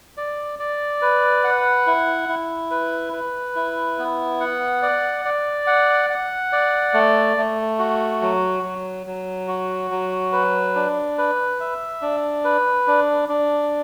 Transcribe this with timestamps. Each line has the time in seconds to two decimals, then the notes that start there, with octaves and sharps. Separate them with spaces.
0.17 D5
0.59 D5
1.02 B4
1.44 F#5
1.87 E4
2.29 E4
2.71 B4
3.13 B4
3.56 E4
3.99 B3
4.40 F#5
4.82 D5
5.25 D5
5.67 F#5
6.10 F#5
6.52 D5
6.94 A3
7.37 A3
7.79 F#4
8.22 F#3
8.63 F#3
9.07 F#3
9.48 F#4
9.91 F#3
10.32 B4
10.75 D4
11.18 B4
11.60 E5
12.02 D4
12.44 B4
12.87 D4
13.29 D4